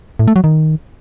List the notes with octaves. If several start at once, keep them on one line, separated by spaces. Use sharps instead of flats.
A2
A3
F#3
D#3